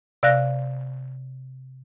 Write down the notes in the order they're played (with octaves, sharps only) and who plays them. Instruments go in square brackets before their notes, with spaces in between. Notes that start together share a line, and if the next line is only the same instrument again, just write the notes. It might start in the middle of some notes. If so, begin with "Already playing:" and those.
[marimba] C3 D5 F5 F#6 A#6